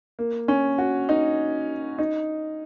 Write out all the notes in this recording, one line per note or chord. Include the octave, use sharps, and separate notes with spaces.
A#3
C#4
F#4
D#4
D#4